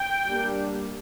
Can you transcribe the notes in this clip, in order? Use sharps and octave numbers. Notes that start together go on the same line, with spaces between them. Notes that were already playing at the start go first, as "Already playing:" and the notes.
Already playing: G5
G3 A#3 D4